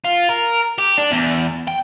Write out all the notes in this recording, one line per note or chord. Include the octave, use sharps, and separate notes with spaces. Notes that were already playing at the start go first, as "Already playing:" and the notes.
F4
A#4
G4
D4
E2
G5